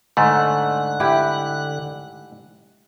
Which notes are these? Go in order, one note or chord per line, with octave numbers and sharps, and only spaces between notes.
G#2 D3 A3 F#6
E4 G4 B4